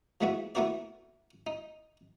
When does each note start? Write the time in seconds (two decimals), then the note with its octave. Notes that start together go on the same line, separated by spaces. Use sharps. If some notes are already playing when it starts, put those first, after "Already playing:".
0.21 F3 G#3 A3 B3 E4 F#4
0.55 A3 B3 E4 F#4 A#4 D5
1.47 D#4